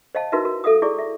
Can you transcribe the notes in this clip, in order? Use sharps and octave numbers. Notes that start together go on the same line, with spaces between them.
C5 D#5 F5 A5
D#4 E4 F#4 A#4 B4 E5
F#4 A#4
A4 E5 F5 D#6
E4 G#4 D5 C#6
E5